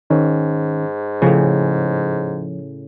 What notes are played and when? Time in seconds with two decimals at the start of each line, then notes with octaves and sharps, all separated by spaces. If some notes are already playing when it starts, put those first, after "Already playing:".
0.11 G#2 D#3 C#4
1.22 A2 C#3 F3